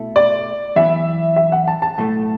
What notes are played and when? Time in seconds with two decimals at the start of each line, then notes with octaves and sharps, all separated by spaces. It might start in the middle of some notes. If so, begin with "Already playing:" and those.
Already playing: B2 A3 E4 A4
0.16 D5
0.76 F#2 E3 B3 E5
1.36 E5
1.52 F#5
1.67 A5
1.82 A5
1.98 B1 A2 A3